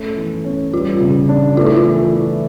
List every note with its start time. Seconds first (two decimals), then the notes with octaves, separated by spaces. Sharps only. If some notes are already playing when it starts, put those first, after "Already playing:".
Already playing: A3 C#4
0.16 E3
0.44 C#4
0.73 G3 F4
1.00 C#3
1.29 D4
1.57 A3 F4
1.66 E4
1.76 F4
1.85 E3
2.12 E4